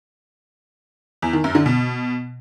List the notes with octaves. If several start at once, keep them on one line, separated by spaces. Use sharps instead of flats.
E2
D#3
F#2
D3
B2